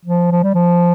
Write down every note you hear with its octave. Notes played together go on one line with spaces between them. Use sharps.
F3
F3
G3
F3